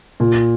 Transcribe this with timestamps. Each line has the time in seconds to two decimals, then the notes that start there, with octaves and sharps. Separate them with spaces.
0.20 A#2